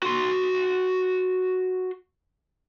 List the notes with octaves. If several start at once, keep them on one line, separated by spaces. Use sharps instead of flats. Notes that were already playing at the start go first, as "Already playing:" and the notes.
F#4 C6